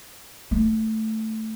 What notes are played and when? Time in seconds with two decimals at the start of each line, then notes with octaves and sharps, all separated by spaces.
0.51 A3